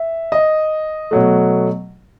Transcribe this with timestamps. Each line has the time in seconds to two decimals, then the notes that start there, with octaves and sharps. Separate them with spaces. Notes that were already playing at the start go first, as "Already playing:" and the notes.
Already playing: E5
0.32 D#5
1.11 B2 F#3 A3